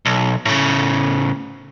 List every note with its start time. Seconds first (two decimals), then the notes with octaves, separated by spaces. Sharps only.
0.06 B1
0.45 A2 C#3